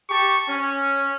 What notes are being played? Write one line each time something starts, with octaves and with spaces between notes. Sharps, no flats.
G4 A5 C#6
C#4